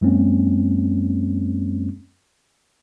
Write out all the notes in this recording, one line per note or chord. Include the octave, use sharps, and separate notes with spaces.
F#2 F#3 G#3 A#3 C4 C#4